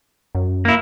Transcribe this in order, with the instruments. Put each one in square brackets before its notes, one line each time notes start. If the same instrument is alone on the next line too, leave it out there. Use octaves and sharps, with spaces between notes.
[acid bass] F#2
[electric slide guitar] A#3 E4